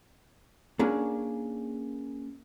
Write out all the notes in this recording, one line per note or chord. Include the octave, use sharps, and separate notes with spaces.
A#3 C#4 D4 G#4